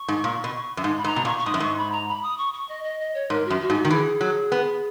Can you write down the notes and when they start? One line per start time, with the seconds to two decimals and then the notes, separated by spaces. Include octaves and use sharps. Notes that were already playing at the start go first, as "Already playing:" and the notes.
Already playing: C#6
0.08 G#2
0.24 A#2
0.44 B2
0.77 F#2
0.84 G#2
0.97 B5
1.04 G#2 A#5
1.16 B2
1.25 A#2 C#6
1.38 C#6
1.45 G#2 D#6
1.54 F#2
1.60 G#2 C#6
1.77 B5
1.92 A#5
2.08 B5
2.22 D#6
2.37 C#6
2.53 C#6
2.68 D#5
2.83 D#5
2.99 D#5
3.14 C#5
3.30 G#2 A#4
3.45 F#4
3.50 F#2
3.60 F#4
3.70 G#2
3.76 F#4
3.85 D#3
3.90 E3 G#4
4.21 F#3
4.52 B3